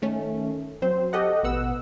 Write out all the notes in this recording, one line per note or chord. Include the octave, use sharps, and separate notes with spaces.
D#3 A3 C#4
F#3 C4 C5
G4 A4 D#5 F#5
A1 B2 B3 F#5 E6